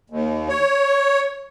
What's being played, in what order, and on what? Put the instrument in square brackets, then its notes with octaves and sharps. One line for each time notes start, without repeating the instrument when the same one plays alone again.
[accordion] D#2
C#5